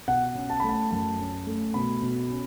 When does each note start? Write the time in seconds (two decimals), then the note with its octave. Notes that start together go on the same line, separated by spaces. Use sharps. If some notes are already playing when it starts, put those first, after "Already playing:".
0.08 B2 F#5
0.35 C#4
0.50 A5
0.60 A3 B5
0.69 A5
0.91 F#2 A5
1.19 C#4
1.47 A3
1.74 B2 B5
2.02 B2
2.30 C#4